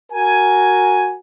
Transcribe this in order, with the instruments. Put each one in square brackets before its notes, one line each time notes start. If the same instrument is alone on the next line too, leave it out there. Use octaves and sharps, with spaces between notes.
[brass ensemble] F#4 A#4 G#5